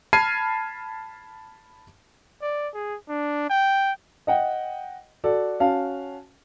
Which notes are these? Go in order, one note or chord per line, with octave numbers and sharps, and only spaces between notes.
A5 B5 F6 G#6 C7 D#7
D5
G#4
D4
G5
D#5 F#5 G5
F#4 A4 D5
C#4 F#4 F5 A5